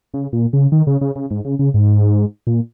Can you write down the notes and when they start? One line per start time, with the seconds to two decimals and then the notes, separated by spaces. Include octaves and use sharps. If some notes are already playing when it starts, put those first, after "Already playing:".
0.14 C#3
0.33 A#2
0.53 C#3
0.72 D#3
0.87 C#3
1.01 C#3
1.16 C#3
1.31 G#2
1.45 C#3
1.59 C#3
1.74 G#2
2.47 A#2